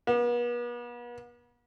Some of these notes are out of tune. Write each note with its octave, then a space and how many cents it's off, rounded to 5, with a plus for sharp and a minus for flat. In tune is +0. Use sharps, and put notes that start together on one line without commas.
B3 -40